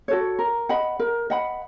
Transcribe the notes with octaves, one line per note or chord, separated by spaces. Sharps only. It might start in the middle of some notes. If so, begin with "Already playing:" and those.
F#4 A4 C#5
A#4
D#5 F#5 B5
A#4
D#5 F#5 B5